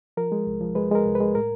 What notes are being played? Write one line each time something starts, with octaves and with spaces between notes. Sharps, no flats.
F3 A#4
G#3
C2
F3
G#3 B4
G#3 A#4
C2
B4
G#3
A2 A#4